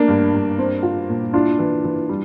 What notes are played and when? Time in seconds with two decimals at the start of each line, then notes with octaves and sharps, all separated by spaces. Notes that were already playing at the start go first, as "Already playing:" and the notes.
Already playing: A3 A#3 D4
0.08 G2
0.33 G2
0.59 C4
0.83 F4
1.09 A#2
1.33 D4 E4 F4
1.59 E3
1.84 E3
2.09 G3